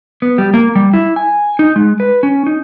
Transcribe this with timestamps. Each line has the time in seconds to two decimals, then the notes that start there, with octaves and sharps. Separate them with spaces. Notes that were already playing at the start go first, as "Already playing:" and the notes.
0.22 B3
0.38 G3
0.54 A#3
0.75 G3
0.94 E4
1.16 G#5
1.59 D#4
1.76 G#3
2.00 B4
2.23 C#4
2.46 D#4